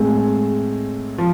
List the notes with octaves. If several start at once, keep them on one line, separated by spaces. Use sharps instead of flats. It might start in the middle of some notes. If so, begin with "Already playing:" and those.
Already playing: A2 G#3 C4 G#4
F3